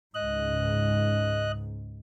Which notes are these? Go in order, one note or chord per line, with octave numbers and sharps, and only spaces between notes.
C#2 G#2 D#5 F#6